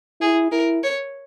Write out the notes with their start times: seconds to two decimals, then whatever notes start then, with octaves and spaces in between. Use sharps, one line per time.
0.21 E4 G#4
0.52 E4 A#4
0.83 C#5